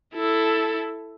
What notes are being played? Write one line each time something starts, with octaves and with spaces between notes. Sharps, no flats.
E4 A4